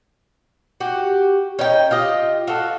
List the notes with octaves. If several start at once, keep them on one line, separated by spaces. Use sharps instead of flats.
F#4 G4
C#4 D#4 G5
F4 G4 D#5
F4 F#4 A4